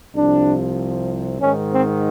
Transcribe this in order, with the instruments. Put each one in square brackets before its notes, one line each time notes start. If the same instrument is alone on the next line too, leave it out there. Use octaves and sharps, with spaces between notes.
[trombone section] C2 C3 F3 D4
G#2 D#3 C#4
C4